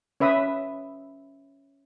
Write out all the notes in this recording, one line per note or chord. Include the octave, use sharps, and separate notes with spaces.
C#4 B4 E5 B5 D#6